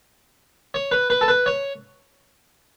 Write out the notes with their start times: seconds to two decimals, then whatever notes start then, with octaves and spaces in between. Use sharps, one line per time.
0.74 C#5
0.92 B4
1.10 B4
1.21 A4
1.28 B4
1.46 C#5